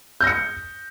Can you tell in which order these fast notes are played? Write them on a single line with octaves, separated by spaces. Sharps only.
G6 A#6 C#7